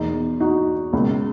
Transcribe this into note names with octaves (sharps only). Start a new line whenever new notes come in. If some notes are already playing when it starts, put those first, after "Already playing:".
Already playing: E2 B2 A#3 D#4
D#4 F#4
C#2 B2 A#3